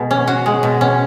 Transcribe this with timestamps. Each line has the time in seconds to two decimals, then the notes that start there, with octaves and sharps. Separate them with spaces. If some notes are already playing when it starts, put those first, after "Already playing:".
Already playing: B2 G#3
0.11 C#4
0.27 F#4
0.46 G#3
0.63 B2
0.81 C#4